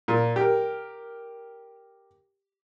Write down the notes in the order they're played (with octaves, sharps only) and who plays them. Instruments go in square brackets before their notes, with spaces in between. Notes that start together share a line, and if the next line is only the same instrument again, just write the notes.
[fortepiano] A#2
G4 A#4